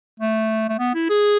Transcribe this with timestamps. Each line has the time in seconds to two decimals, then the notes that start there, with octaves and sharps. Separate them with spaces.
0.20 A3
0.69 A3
0.79 B3
0.95 E4
1.10 G#4